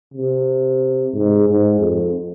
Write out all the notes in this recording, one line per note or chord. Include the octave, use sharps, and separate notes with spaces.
C3
G#2
G#2
F2